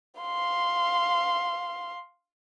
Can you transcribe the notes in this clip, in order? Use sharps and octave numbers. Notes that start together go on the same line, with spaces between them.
F5 C6